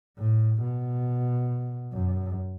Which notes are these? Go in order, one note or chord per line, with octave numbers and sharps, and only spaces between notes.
A2
B2
F#2